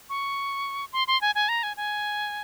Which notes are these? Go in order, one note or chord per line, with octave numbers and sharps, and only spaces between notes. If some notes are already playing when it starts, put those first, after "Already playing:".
C#6
C6
C6
G#5
G#5
A#5
G#5
G#5